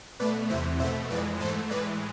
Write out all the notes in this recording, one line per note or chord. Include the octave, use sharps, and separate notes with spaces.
B2 A3 B4 D5
E2 C3 E3 C5 E5
B2 A3 C5 E5
F2 E3 G#3 B4 D5
G#2 E3 A3 A4 C5
A2 E3 G#3 B4 D5